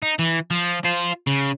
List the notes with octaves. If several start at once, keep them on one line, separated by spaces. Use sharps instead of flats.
D#4
E3
F3
F4 C5
C#3